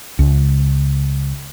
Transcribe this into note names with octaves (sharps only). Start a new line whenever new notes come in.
C#2